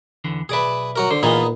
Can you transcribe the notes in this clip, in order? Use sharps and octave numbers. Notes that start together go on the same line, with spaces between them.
E2 D3 E3
B1 G#4 B4 D5 E5
F#3 F#4 A#4
D3 C5
A#2 E3 B3 D#4 F4 G#4 D#5